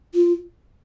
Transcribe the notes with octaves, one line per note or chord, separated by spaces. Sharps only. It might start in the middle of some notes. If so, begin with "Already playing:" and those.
F4